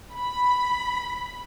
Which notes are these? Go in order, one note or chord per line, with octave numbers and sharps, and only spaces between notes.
B5